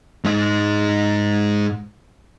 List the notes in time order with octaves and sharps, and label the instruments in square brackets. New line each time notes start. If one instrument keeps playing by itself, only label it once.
[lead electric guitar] G#2 D#4